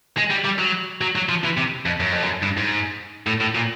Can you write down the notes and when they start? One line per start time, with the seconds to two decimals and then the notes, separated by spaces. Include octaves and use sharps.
0.17 G#3
0.31 G3
0.45 G3
0.59 F#3
1.01 F#3
1.16 F#3
1.29 F3
1.44 E3
1.57 C3
1.86 F2
2.00 F#2
2.12 F2
2.23 F#2
2.42 G2
2.57 G#2
3.27 A2
3.41 A2
3.55 A#2